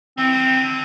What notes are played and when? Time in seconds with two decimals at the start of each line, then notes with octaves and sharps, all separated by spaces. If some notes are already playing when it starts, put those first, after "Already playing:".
0.18 E3 C4
0.33 G3
0.40 F3
0.47 E3
0.55 D3